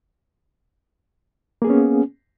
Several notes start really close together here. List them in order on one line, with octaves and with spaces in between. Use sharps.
A#3 G#4 B3 C#4